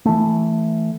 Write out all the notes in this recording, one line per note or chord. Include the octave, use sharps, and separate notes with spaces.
E3 A3